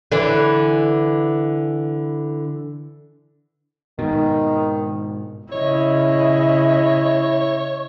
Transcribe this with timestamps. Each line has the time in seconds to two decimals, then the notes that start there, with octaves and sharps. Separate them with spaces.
0.12 D3 E3
3.99 G#2 B2 D#3
5.52 C#3 E4 C#5 D#5